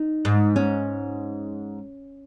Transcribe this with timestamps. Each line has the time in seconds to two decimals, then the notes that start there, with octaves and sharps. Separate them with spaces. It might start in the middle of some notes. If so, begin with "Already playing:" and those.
Already playing: D#4
0.25 G#2
0.56 C#4